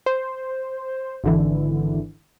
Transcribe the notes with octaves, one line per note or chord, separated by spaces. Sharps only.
C5
G#1 D3 E3